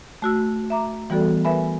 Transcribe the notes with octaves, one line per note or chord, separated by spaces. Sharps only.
A3 F#4 E6
E5 A#5 D6
E3 G3 B3 F#4 A4 D5
A#4 B4 E5 G#5 B5